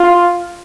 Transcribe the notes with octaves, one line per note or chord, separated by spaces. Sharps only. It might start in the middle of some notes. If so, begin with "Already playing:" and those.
Already playing: F4